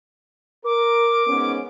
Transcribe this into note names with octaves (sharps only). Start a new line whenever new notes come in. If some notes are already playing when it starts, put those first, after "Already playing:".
A#4 D6
G#2 B3 C#4